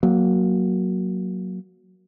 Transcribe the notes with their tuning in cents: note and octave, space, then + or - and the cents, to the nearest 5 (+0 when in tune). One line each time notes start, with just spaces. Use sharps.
F#3 +0 A#3 +10